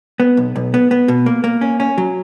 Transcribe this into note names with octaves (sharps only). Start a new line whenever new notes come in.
B3
B1
B1
B3
B3
B2
A#3
A#3
C#4
C#4
F#3